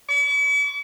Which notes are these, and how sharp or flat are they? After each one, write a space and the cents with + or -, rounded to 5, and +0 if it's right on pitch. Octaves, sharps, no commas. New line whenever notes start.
D6 -45